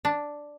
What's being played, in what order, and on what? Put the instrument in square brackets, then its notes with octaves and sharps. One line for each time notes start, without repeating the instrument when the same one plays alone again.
[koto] D4